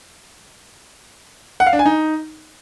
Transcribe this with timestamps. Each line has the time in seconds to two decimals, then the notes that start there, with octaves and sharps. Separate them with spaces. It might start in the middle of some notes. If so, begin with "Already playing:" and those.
1.60 F#5
1.66 F5
1.73 D4
1.79 G#5
1.86 D#4